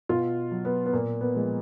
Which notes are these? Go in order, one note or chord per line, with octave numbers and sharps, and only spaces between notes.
B2 F4
F#3
B3
B3
A#2 A#3
B3
F3 G#3